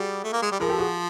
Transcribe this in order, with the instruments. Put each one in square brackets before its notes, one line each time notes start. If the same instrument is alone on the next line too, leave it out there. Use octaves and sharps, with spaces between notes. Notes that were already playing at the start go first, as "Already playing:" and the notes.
Already playing: [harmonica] G3 [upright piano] F#4 G#4
[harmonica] A3
A#3
G#3
G3
[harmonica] F3 [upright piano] G#4 A#4
[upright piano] G4 A4
F#4 G#4